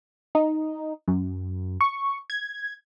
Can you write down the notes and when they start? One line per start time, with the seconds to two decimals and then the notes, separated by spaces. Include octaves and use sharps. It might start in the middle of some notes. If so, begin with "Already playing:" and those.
0.35 D#4
1.08 F#2
1.81 C#6
2.30 G#6